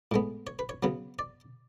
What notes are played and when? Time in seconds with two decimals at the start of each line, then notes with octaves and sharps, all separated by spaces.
0.12 A2 G#3 B3
0.47 C#5
0.59 B4
0.69 C#5
0.83 C#3 F#3 B3
1.19 D5